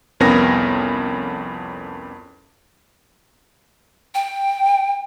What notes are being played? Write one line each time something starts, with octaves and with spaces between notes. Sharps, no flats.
C2 F2 B3 C#4 A#4 A#6
G5